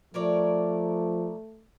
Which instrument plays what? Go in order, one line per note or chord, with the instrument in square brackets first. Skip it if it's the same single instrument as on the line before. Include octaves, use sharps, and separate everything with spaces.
[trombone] F3 [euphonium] A3 [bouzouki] A#4 C#5 D5